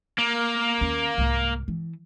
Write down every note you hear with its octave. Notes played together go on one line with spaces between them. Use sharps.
A#3
D#2 C#4
C2 G#2
E3